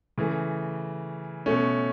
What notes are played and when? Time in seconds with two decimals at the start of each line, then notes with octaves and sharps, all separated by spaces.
0.18 C#3 E3 A3
1.46 B2 A3 C#4